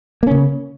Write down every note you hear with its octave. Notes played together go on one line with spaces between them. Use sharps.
C#3 A#3 C#4